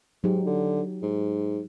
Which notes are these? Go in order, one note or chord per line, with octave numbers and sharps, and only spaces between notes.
G#2 F#3 D#4 G4
D3
G#2